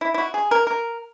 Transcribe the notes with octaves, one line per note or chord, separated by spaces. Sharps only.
E4
E4
F#4
G#4
A#4
A#4